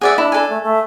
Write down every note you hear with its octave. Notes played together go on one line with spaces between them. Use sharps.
G#4 D5 E5 F#5
D4 E4
A4 G#5
A3
A3